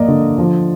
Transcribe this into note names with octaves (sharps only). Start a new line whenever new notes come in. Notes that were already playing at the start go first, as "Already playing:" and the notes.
Already playing: A#3 D5 D#5
D3
F3